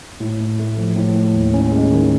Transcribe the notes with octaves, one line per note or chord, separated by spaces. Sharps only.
A2
A2
A3
F3
A2
A2
D#2
C#4
G#3
D#3